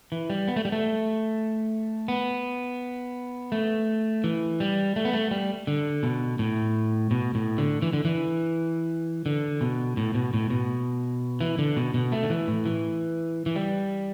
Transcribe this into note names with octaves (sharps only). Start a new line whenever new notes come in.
E3
G3
B3
A3
G3
A3
B3
A3
E3
G3
A3
B3
A3
G3
D3
B2
A2
B2
A2
D3
E3
D3
E3
D3
B2
A2
B2
A2
B2
E3
D3
B2
B2
A3
D3
E3
A2
E3
E3
G3